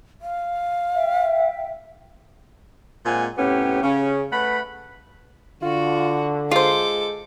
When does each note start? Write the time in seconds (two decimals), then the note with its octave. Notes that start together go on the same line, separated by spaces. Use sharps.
0.22 F5
0.93 E5 G5
3.06 A#2 G#3 C4 F4 F#5 G#5
3.38 A2 C3 B3 C#4 G4
3.83 C#3 C#4
4.32 A3 B4 F#5 B5
5.63 D3 F4 F#4
6.51 G#3 F4 A4 C5 D6